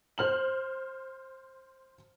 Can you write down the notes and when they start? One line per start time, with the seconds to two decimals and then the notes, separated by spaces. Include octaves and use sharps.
0.18 C5 F6 F#7